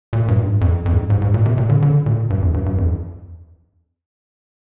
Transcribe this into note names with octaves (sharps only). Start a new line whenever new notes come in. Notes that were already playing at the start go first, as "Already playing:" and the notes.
A#2
G2
G#2
F2
F2
G#2
G2
G#2
G#2
A#2
C3
A#2
D3
D3
A#2
G2
F2
G2
G2
F2